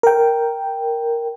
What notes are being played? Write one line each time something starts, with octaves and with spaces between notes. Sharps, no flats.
A#4 G5